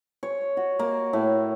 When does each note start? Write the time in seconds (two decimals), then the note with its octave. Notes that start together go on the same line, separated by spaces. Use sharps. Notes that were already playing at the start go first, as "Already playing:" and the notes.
0.23 C#5
0.57 F#4
0.79 A#3
1.13 A2